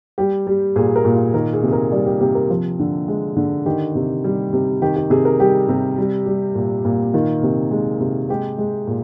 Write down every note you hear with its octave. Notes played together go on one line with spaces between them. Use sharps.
G3 G4
G3
A#2 G#4
A#4
A#2
F4
D#3 A#4
G#4
C3
G#4
A#4
G3 D5
G4
C3 G4
A#4
F3
D3
G#3
D3
D#3 G4
C3
G3
C3
D#3 G4
G4
C3 G#4
A#4
G3 G4
C3
G3
G3
A#2
A#2
D#3 F4
C3
G#3
C3
G#3 G4
G#3
A#2